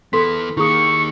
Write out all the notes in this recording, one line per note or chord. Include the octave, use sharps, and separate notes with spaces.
E3 B3 A4 C6 B6
D#3 A#3 E4 G#4 C#6 D#6